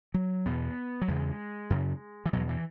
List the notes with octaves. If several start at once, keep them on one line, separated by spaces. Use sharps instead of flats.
F#3
E2 B2 B3
F#3
E2 C#3 G#3
F#2 C#3
E3
E2 B2 F#3
E3